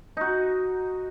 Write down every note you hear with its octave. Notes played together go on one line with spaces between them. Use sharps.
D#4 F#4